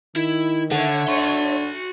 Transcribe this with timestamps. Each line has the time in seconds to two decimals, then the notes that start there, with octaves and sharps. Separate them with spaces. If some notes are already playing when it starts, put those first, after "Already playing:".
0.16 D#3 E4
0.71 D3 A4 C#5 E5 F#5
1.08 D4 F#4 C6